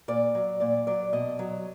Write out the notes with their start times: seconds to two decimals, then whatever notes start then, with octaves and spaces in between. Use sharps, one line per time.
0.08 A#2 D5
0.35 F#3
0.60 A#2 D5
0.87 F#3 D5
1.13 B2 D#5
1.39 F#3